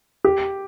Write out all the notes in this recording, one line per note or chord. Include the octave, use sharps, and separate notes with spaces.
G4